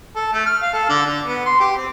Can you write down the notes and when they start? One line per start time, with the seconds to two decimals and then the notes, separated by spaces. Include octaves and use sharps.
0.16 A4
0.33 A3
0.46 F6
0.62 F5
0.73 A4
0.89 D3
1.06 D3
1.24 B3
1.46 C6
1.60 G4
1.76 C4